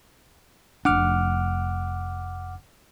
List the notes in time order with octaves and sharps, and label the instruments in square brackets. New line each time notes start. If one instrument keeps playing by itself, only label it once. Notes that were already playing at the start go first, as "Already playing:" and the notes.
[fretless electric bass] F1 D4 [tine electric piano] F#5 D6 F6